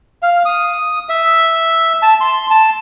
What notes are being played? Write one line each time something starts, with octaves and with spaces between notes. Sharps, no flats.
F5
D#6
E5
A5
C6
A5